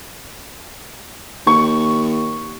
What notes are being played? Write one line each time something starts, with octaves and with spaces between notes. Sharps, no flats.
D#2 C#6